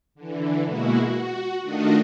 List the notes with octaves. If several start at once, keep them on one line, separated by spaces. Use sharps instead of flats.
D3 E3
B2 G#3 A#3 E4 F#4
F#4
D#3 A3 D4 F4 F#4 D#5